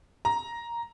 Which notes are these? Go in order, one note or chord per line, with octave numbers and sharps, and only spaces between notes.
A#5